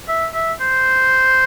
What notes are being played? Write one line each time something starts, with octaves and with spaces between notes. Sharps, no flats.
E5
E5
C5